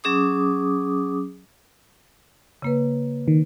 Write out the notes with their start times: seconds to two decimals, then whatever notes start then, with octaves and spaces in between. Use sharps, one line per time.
0.04 F#3 C#4 G#4 D6 D#6
2.62 C#3 A#3 B4
3.28 D#3